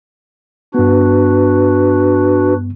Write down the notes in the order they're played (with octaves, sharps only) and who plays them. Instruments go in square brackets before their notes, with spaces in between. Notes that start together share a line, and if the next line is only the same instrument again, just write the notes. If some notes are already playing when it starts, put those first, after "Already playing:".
[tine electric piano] G2 B3 [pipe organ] D4 F#4 B4